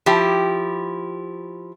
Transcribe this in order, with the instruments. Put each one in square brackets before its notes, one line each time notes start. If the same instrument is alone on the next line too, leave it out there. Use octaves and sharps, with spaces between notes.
[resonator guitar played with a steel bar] F3 E4 G4